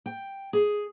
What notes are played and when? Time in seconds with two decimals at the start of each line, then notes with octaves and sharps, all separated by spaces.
0.06 G5
0.53 G#4